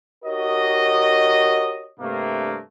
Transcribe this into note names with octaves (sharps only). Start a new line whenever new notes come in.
D#4 F#4 G4 A#4 C#5 D#5
G2 C3 A3 A#3